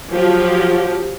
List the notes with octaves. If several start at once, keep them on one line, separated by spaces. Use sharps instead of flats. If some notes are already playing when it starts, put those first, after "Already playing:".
F3 F#3 G4